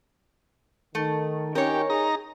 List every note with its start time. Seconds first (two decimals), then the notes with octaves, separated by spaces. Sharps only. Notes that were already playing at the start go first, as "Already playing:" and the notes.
0.95 D#3 A3
1.55 D#3 C#4 G4 A#4 C#5
1.90 D#4 G#4 A#5